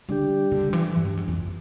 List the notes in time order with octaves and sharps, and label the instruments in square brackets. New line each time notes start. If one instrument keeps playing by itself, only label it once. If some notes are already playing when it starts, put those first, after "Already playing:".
[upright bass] D3 [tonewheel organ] G3 D4 G4
[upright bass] D3
E3
G2
F2
E2
F2